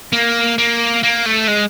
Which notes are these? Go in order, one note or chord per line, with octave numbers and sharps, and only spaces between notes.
A#3
A#3
A#3
A3
G#3